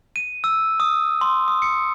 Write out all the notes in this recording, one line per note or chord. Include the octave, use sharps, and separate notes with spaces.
D#7
E6
D#6
C6
D#6
C#7